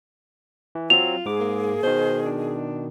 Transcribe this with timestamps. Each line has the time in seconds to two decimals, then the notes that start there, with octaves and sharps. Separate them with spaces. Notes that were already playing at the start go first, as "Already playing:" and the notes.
0.75 E3
0.90 F#3 C4 F4 F7
1.26 G#2 G#4 D6
1.40 A#3
1.83 B2 D#3 C5
2.25 D4